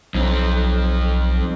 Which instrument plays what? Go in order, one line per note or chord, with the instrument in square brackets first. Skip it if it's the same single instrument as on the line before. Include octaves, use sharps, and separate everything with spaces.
[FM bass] B1 [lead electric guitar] F2 F3